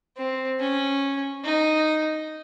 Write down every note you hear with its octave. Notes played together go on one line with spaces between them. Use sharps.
C4
C#4
D#4